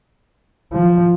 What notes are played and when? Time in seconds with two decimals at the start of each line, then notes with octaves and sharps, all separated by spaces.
0.73 F3